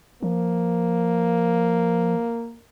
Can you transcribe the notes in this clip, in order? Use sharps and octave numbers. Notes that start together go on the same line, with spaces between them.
F3 A#3